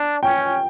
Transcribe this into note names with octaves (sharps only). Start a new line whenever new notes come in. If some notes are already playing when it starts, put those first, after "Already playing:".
Already playing: D4
C#4 G5